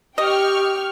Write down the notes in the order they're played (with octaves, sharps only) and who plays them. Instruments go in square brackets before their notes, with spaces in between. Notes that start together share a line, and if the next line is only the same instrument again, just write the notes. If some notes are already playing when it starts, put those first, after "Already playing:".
[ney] G4 [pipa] D#5 [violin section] G5 C#6 F6